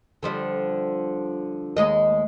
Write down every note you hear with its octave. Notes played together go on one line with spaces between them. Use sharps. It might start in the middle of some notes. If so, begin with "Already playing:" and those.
D3 F3 G3
D#2 G#3 D#5